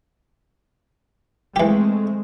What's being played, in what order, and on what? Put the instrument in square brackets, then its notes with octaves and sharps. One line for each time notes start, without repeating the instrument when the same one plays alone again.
[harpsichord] E3 G4 [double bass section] G#3 A3 C4